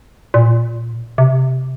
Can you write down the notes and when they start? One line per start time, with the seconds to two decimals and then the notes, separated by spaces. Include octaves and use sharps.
0.34 A#2
1.18 C3